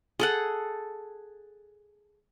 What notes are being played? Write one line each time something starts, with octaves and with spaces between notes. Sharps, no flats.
G#4 A4 F#5